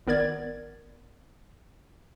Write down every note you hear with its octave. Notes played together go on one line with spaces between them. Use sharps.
G#1 B3 A#4 D5 G#6 A6